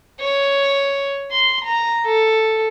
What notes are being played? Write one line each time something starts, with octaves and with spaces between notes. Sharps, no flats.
C#5
C6
A#5
A4